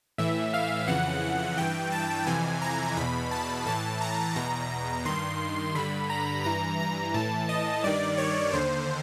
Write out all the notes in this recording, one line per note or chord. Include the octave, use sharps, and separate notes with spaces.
A2 E3 E5
F5
F2 C#3 E3 F#5
G2 E3 G5
A5
F2 C3 E3 G#5
A#5
E2 B2 B5
A5
A2 E3 A5
A#5
E2 B2 A#5
G2 D#3 C6
G2 D3 B5
A#5
G2 E3 A#5
A#5
A2 E3 A5
D#5
G2 D#3 D5
C#5
D#2 D3 C5